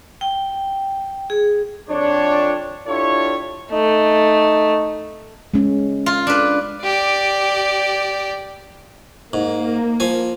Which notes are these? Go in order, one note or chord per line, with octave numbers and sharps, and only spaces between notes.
G5
G#4
F2 D4 C#5
D4 E4 F4 G4 A4 C#5
A3 D#4
G#3 C#4
F4
D4 B4
G4 D5
G#2 A#3
F3 G#5